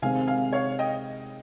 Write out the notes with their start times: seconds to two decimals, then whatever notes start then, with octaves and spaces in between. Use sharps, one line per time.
0.02 C3 D#3 G#3 C4 F5 G#5
0.27 F5 G#5
0.53 C#5 F5
0.79 D#5 G5